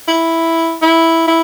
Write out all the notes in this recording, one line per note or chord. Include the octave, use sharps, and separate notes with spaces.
E4
E4
E4